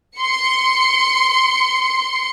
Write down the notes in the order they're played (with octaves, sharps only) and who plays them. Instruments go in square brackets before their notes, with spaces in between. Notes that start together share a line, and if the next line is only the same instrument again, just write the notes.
[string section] C6 C#7